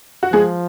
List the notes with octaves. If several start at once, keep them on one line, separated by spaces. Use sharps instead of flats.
F#4
F3 G#3 G#4